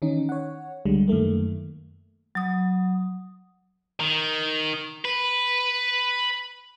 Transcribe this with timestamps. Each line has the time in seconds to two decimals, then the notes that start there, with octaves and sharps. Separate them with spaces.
0.02 D#3 E3 C#4 D#4
0.29 C#5 F#5
0.85 C#2 D3 G3 G#3
1.08 F#2 D#3 A3 A#3
2.35 F#3 D#6
4.00 D#3
5.05 B4